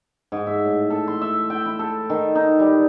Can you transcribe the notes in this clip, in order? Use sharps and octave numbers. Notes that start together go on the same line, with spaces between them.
G#2
E5
A2
A4
C6
E5
G5
E4
A4
D#3
D#4
G3